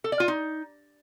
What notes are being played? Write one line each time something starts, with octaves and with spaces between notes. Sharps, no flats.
A4
D5
F4
D#4